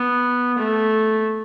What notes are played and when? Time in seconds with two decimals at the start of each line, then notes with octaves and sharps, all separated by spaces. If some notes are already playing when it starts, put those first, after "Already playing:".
Already playing: B3
0.58 A3